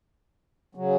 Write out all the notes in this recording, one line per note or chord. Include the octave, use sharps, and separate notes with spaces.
C#3 F#3